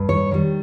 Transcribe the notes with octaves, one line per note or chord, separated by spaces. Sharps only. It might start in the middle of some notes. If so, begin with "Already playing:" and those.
Already playing: G2
C#5
D#3 G3